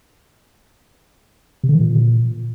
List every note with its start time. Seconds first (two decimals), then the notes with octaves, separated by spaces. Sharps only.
1.64 C3
1.69 D3
1.74 E3
1.80 A#2